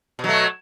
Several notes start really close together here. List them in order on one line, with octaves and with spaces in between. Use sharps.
B2 F#3 A3